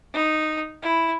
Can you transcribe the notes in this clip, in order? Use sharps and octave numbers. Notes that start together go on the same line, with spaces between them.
D#4
E4